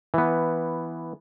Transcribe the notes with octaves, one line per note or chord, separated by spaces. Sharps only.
E3 B3